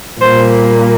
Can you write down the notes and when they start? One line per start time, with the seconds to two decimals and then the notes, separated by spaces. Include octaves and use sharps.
0.21 A#2 G3 A#3 C5